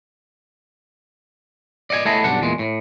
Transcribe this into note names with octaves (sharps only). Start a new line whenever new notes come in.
D5 D#5 F#5 G#5
A3 B3 E4 G#4 A4 D#5
B1 G2 D4 F#5
E2 A#2 G#3
A2